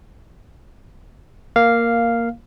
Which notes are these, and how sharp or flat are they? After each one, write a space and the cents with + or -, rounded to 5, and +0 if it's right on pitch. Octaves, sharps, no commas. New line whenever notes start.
A#3 +0 F5 -5